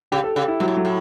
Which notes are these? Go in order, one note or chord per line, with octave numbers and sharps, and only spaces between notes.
C#3 G4
A4
C#3 G4
E4
B2 F#3
A2
F#3
A2